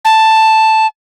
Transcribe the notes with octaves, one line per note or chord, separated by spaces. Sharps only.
A5